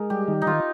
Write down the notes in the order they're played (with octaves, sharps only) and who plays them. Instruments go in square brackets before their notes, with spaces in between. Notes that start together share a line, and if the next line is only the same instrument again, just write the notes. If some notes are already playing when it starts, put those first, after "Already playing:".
Already playing: [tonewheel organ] G#3 [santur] D#4 A#4
[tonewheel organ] G3 [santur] G4
[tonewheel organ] D#3
[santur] D#4
[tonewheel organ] D#3 [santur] F4